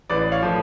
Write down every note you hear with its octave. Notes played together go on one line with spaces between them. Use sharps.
A1 B4 D5
C#5 F5
A2 F3